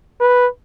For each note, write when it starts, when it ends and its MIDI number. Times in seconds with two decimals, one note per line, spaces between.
0.21 0.47 71